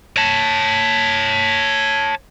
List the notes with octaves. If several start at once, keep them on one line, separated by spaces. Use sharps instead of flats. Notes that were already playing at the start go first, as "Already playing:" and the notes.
C#5 A5